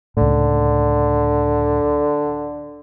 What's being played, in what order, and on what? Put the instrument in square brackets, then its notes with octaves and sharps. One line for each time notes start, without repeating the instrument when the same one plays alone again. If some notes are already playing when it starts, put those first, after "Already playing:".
[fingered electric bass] C#2 A2 [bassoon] D3